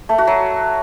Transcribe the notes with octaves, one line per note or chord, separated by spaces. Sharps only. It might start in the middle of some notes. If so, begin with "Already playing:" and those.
A3
F#4
F#3